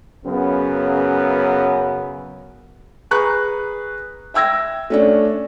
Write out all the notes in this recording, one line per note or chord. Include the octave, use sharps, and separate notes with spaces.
F#2 C#3 B3
G#4 B4 A#5 C#6 F#6
E5 G5 E6 G#6 A#6
A3 C#4 D4